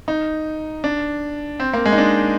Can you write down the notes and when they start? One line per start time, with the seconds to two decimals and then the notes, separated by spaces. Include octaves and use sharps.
0.08 D#4
0.84 D4
1.60 C4
1.73 A#3
1.86 G#3
1.93 D#4
1.98 D4